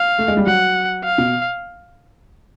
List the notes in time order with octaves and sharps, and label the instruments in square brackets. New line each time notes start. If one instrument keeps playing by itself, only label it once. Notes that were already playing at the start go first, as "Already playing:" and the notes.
Already playing: [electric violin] F5
[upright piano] A3
G#3
G3
[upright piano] F#3 [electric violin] F#5
[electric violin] F5
[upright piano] B2